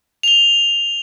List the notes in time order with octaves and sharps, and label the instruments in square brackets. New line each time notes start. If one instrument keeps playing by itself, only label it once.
[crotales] F7 G7